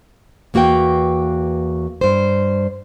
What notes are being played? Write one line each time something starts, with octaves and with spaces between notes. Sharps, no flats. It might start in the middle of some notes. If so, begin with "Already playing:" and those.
E2 A#3 F#4 B4 G5
G2 C5